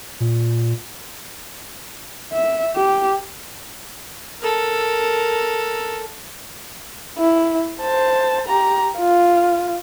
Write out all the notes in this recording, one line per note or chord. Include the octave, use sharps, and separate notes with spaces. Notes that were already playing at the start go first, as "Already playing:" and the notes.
A#2
E5
G4
A4 A#4
E4
C5 A5
G4 A#5
F4